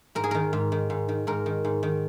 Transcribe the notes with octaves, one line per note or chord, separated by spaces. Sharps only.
G#2 A#4
G#4
D#3 A#4
G#2
D#3
G#2
D#3
G#2 A#4
D#3
G#2
D#3